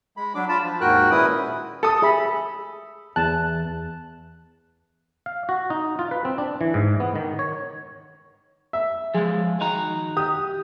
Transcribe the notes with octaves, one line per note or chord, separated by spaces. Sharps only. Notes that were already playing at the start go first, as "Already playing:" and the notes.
G#3 B5
F#3 D4 D6
F4 A5 B5
F3
D#2 G#2 F#4 A#4 G5 F#6
A#2 G#3 C#4 E4 B4 D#6
G4 A4 D#6
G#4 E5 B5
E2 A5 F#6
F5
F#4
D#4
F4
B4
C4
D4
E3
G#2
B3
D#3
C#5
E5
F3 G#3 G#4
D#3 D#4 F#4 A#5
G4 D#6